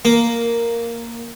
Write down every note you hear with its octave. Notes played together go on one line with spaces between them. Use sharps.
A#3